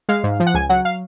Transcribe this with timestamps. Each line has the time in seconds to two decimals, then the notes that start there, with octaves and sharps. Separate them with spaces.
0.09 G#3 F5
0.23 G#2
0.40 F3
0.47 F#5
0.54 C#2 G#5
0.69 F#3 F#5
0.85 F5